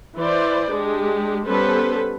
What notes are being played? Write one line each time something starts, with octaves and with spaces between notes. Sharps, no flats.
E3 B4 C5 D5
G#3 D4 G4
G3 B3 C#4 A4 B4 C5